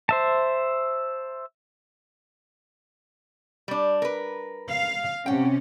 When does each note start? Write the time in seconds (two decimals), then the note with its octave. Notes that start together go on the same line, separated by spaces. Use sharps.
0.09 C5 E5 A5
3.68 G3 D4
4.02 A#4 B4
4.69 F5
5.26 C3 C#4 F#5 G5